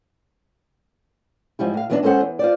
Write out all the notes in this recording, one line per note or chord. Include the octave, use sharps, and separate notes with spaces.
G#2 F3 G3 E4
A2 F5
E3 F#3 B3 C4 D4
G#3 C#4 A4 B4 C5 F#5
E2
F4 C5 D5